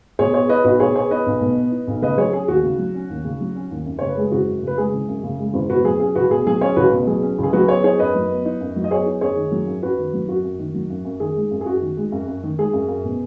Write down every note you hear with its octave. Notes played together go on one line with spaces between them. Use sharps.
B2 G#4 C#5
B3 G#4 C#5
D#4 B4 D#5
B1 F#4 B4
B2 G#4 C#5
B3 G#4 C#5
D#4 B4 D#5
B1
B2
B3
D#4
B1
C#3 B4 D#5
F#3 G#4 C#5
C#4 G#4
D#2 F#4
C#3
F#3
C#4
D#2
C#3
F#3
C#4
D#2
F#2
C#3 C#5
B4
G#3 G#4
F#1 F#4
F#2
C#3 B4
G#3 G#4
F#1
F#2
C#3
G#3
F#1
B2 F#4 B4
F#3 G#4
C#4 G#4
C#2 F#4 B4
B2 G#4
F#3 G#4
C#4 G#4 C#5
C#2 F#4 B4
B2
F#3 G#4
C#4
C#2 G#4
F#3 F#4 B4
B3 G#4 C#5
D#4 G#4 C#5
F#2 B4 D#5
F#3
B3
D#4
F#2
F#3
D#5
B3 G#4 C#5
D#4
F#2 G#4 C#5
D#3
F#3
F#2
F#2 F#4 B4
D#3
F#3
F#2 F#4
F#2
D#3
F#3
F#2
F#2
D#3 G#4
G#3
F#2
G#4
F#2 F#4
D#3
G#3
F#2
F#2
D#3
G#3 G#4
F#2
F#2
B2